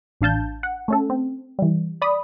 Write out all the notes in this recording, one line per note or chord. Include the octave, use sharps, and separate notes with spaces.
A1 D4 F5 A5 G6
F#5
A3 C#4 A4
C4
E3 G3
D5 B5 D#6